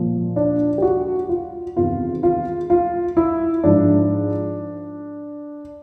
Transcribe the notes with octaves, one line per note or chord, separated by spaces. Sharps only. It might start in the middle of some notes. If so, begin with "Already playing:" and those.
Already playing: A#2 F3
D4
G4
F#4
F4
E2 C3 D#3 F4
F4
F4
E4
G#2 F3 D4